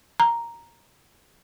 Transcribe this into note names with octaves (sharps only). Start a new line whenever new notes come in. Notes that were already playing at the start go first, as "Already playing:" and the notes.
A#5